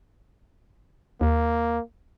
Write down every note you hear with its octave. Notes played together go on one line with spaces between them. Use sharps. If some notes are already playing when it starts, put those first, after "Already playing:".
D#2 A#3